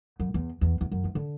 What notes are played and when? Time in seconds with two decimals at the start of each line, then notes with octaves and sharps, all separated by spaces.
0.20 F#2
0.34 E2
0.61 E2
0.81 E2
0.92 F#2
1.04 E3
1.15 D3